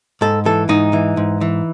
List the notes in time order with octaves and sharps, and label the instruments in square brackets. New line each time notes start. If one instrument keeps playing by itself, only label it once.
[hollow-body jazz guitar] G#2 A4
E3 A4
G#2 D#4
E3
G#2
E3